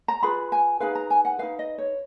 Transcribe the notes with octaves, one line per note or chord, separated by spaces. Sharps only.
A#5
F4 G#4 B4 B5
G#5
D#4 G#4 B4 F5
A#5
G#5
F#5
D#4 G#4 B4 F5
D#5
C#5